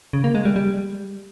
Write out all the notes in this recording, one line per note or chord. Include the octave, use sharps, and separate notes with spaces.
C#3
A#3
G#3
G3
G3